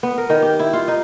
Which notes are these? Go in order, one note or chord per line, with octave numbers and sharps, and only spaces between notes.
B3
A#4
D#3
G4
E4
F4
D#4